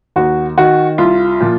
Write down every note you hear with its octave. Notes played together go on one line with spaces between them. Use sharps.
D#2 F#4
D#3 F#4
C2 F4
A#2 F3